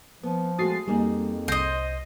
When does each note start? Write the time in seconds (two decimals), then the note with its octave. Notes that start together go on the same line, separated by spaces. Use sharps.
0.23 F3 B3
0.59 G#3 A3 F#4 D#6 A6 C7
0.88 F2 G3 A#3 D#4 G#4
1.48 C2 C5 D#5 A#6